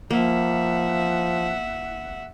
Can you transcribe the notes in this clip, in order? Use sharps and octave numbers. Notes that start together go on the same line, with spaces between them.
F3 A#3 E5 F#5